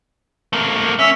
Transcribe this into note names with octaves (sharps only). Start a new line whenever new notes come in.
A3 A#3
C#4 E5